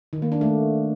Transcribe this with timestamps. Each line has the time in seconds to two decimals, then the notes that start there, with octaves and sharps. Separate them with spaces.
0.13 D#3
0.22 A#3
0.32 D4
0.41 A3